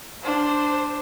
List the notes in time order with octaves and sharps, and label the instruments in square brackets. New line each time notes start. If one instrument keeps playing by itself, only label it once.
[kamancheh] D4 C5